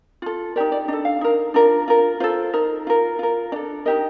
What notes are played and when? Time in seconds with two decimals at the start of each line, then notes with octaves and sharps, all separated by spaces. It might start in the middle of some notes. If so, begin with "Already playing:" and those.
0.22 F4 A4
0.56 D#4 G4 A#4 D5
0.72 D5
0.88 D4 D#5
0.93 A4
1.05 F5
1.21 D#4 A#4
1.54 D4 F4 A#4
1.88 F4 A#4
2.20 F4 A4 C5
2.53 D#4 A#4
2.87 F4 A#4
3.19 F4 A#4
3.52 D4 D5
3.56 A4
3.85 D#4 G4 A#4 D#5